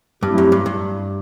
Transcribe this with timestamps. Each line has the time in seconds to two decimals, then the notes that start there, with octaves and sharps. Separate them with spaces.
0.23 G2 F#3 A3 C4 E4 G4
0.38 F#2
0.52 G2
0.66 G2